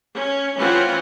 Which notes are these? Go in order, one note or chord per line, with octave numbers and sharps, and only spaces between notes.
C#4
E3 C4 C#4 F4 F#5